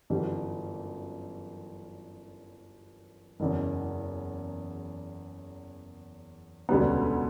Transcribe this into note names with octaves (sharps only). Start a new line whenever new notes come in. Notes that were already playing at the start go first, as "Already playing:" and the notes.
G1 F#2 E3 G3
F#1 E2 C#3
E1 D2 C#3 G3 B3